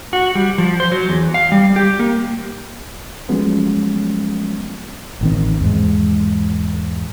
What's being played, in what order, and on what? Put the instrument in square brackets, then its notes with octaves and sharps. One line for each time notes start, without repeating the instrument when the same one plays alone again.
[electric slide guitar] F#4
G3
F3
C5
F#3
E2
F5
G3
G4
A#3
[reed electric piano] F3 F#3 G#3 A3 B3 C#4
[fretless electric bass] A1 D#3 C4
E2 G#2 G#3